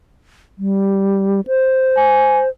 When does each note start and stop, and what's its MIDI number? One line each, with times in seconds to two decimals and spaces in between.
0.59 1.41 55
1.47 2.48 72
1.97 2.43 80